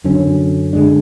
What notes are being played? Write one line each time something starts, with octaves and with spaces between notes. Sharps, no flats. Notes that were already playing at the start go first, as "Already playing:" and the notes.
F#2 D3 F#3 C#4
D3 G#3 D4